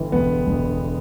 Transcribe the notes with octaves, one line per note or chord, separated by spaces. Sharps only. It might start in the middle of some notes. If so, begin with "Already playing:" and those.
Already playing: G1 E3
E1 B3
E1